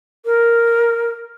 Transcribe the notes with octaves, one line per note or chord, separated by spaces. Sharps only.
A#4